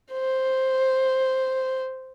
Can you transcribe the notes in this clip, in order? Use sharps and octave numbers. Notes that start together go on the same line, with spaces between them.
C5